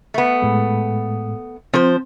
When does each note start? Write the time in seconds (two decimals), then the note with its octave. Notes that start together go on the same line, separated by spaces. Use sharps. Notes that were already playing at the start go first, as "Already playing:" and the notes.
0.14 A3 B3
0.42 A2 G#3
1.74 F3 C4 C5